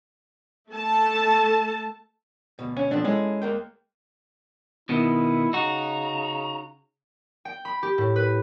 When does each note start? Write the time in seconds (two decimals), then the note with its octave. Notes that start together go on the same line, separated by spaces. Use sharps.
0.70 A3 A4 A5
2.59 D2 B2
2.77 C#4
2.91 B2 D3 F3 C4 D4
3.04 G#3 C#4 E4 A4
3.42 A#3 A#4 G5
4.89 B2 D#3 B3 E4
5.53 C#3 D#4 F#4 A#5
7.45 G5
7.65 B5
7.83 G4
7.98 A2
8.16 B4